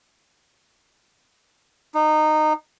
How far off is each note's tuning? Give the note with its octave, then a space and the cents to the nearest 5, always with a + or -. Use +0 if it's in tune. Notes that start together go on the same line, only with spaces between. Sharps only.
D#4 -20